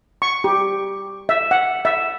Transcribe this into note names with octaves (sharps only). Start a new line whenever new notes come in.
C#6
G4
E5
F#5
E5